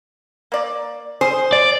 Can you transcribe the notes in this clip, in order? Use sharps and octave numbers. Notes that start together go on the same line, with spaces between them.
A#3 D5
G#4 C5
D5